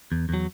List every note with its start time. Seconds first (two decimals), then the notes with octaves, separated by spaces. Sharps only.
0.12 E2
0.29 E2 F#3